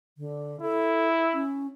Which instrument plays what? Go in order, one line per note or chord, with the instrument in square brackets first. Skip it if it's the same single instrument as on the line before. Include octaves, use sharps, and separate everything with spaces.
[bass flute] D3
[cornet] E4 [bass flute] A4
[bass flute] C#4